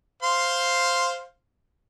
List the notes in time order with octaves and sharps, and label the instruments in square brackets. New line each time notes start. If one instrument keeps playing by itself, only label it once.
[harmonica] C5 F5 C6